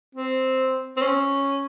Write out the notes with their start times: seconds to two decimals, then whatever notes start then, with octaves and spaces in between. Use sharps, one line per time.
0.15 C4
0.97 C4
1.01 C#4